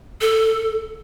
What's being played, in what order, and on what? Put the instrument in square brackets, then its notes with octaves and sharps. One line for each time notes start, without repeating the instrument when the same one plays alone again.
[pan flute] A4